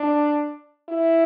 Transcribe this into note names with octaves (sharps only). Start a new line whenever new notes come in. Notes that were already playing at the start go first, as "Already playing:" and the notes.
Already playing: D4
E4